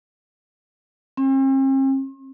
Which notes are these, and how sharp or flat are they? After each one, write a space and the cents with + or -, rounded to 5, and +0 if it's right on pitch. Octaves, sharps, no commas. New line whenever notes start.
C4 +45